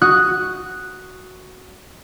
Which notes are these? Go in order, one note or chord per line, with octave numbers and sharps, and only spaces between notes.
F#4 D#6 F#6